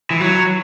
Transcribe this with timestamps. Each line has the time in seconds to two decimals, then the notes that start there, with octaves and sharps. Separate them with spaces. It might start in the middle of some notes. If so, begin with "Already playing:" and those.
0.11 E3
0.21 F#3